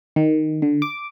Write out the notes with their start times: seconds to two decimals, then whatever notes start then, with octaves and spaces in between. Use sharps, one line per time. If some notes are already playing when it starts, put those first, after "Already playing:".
0.16 D#3
0.62 D3
0.82 D6